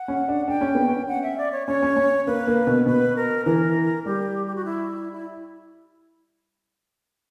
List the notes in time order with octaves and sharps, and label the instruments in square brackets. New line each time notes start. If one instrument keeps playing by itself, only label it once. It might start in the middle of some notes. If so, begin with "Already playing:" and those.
Already playing: [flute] F#5
[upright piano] C#4
D4
[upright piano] D4 [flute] G5
[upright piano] C#4
B3
C#4
[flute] F#5
E5
D5
C#5
[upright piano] C#4 [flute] C#5
[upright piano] C#4
C#4
[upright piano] A#3 [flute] B4
[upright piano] A#3
B2
[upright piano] B2 [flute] B4
[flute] A#4
[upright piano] E3 [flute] A#4
[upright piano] G3 [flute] G4
[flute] G4
F#4
E4
E4